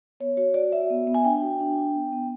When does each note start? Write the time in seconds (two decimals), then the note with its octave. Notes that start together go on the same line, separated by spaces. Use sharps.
0.20 B3 C#5
0.37 F#4 C#5
0.54 F#4 D5
0.72 F#4 E5
0.90 B3
1.07 B3
1.14 G#5
1.25 D4 G5
1.42 F#4
1.60 D4
1.78 D4
1.95 B3
2.12 B3